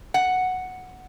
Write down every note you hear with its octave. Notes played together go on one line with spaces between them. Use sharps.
F#5